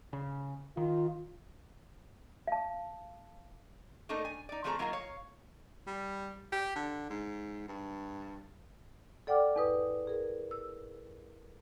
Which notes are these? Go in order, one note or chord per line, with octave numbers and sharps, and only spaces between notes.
C#3
D#3 F4
F5 A5
A3 A#3 D4 D#4 A4
G#5
D#4 D5
F3 A3 C4 G#4 A#4 A#5
F#3 A#3 D#4 F4 A#4 F5
C#5 F5
G3
G4
D3
G#2
G2
A4 D5 F#5 G5 D6 F6
E2 G#2 B4 D#6
G#4 A#4
E6